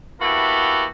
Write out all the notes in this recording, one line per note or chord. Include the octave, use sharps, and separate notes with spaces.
A#3 B3 E4 F#4 G4 A4